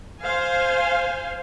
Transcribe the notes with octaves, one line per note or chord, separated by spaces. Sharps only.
C5 F5 G#5